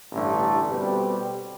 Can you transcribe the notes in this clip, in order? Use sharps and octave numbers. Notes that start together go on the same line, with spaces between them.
A1 G2 D3 A3 D4
B2 G3 C4 G4 B4